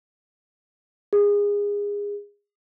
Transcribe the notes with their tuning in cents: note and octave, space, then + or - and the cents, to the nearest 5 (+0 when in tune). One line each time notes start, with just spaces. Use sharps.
G#4 -25